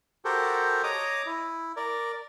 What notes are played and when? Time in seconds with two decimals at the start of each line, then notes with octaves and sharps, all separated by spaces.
0.25 F#4 G4 A4 A#4 C5
0.83 C#5 D#5 A#5 D6 D#6
1.26 E4
1.76 A#4 D5